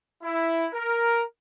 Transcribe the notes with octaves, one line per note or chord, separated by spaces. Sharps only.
E4
A#4